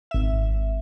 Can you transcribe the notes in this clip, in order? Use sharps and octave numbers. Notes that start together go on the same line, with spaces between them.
G#1 E5